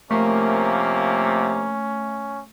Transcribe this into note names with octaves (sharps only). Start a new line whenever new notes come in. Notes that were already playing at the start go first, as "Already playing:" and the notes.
C3 F3 A3 A#3 C#4